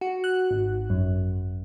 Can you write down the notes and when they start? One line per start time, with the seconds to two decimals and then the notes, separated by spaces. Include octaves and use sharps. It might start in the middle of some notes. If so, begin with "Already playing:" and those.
0.01 F#4
0.24 F#6
0.51 G#1
0.90 F#2